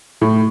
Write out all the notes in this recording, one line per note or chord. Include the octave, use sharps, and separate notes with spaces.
A2